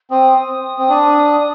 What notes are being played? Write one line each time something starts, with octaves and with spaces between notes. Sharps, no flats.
C4 D#6
C4
D4